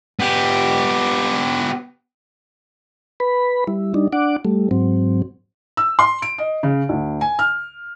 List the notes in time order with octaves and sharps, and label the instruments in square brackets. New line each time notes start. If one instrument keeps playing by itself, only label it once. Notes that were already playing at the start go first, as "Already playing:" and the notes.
[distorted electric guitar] B3 G4
[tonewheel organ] B4 B5
G3 E4
G3 D4 D#4
D4 F#5 D6
G3 A3
G#2 F#3 C4
[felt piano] E6
C6
D7
D#5
C#3
D2
G#5
F6